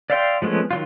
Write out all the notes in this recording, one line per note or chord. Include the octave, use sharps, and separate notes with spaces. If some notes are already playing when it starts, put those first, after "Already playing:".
D5 E5 F5 G5 C6
F3 G#3 A3 B3 C#4
D#3 F#3 F4